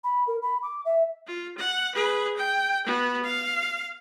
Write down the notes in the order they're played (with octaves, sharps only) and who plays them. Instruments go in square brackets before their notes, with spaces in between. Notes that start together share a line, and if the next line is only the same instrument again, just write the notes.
[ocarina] B5
A#4
B5
D6
E5
[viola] F4
F#5
G#4 B4
G5
B3 F#4
F5